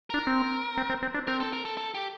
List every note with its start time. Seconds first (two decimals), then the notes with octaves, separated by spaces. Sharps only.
0.10 D4 A#4
0.27 C4
0.77 C4
0.90 C4
1.03 C4
1.14 D4
1.27 C4 A#4
1.40 A4
1.53 A#4
1.65 A4
1.77 A4
1.94 G4